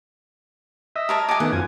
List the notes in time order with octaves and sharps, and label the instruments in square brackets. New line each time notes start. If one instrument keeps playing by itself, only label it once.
[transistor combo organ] D#5 E5
[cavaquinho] A#4 C#5 A5
[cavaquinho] A4 G#5 [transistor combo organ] D#5 D6
[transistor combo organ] D#3 A3 B3 [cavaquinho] F#5
[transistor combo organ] F#2 F3 G#5